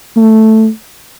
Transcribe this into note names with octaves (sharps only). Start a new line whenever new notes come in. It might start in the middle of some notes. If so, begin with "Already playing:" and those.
A3